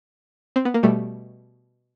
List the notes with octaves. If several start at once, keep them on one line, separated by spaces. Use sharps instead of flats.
C4
B3
A#3
B2 G3 A3